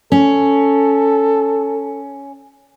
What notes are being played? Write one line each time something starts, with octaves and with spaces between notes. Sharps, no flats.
C#4 A4